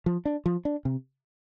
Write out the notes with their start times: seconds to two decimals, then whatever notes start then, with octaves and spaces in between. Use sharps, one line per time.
0.06 F3
0.25 D4
0.46 F3
0.65 D4
0.85 C3